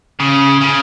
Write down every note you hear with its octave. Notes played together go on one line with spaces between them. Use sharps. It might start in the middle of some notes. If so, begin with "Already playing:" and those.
C#3
C#3